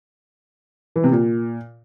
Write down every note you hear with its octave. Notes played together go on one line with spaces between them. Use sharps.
E3
C3
A#2